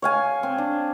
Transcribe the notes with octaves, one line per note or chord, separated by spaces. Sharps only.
C#5 F5 G#5
C4
D4